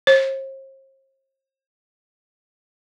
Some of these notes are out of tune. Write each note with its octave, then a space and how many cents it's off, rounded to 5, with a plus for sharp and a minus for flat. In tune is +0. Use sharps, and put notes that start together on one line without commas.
C5 +40